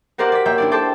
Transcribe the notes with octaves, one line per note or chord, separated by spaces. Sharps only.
F#4 G4 A#4 C5 D5 F#5
D5 B6
A#3 C#5 E5 G5
D4 E4 D5
A4 C5 G5 A5 D6